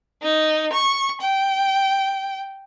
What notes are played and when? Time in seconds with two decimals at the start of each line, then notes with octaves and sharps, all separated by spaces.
0.22 D#4
0.73 C#6
1.21 G5